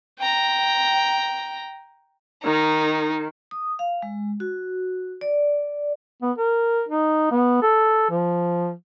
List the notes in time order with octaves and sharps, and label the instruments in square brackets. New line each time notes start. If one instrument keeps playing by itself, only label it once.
[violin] G5 A#5
[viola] D#3 [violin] D#4
[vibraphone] D#6
F5
G#3
F#4
D5
[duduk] B3
A#4
D#4
B3
A4
F3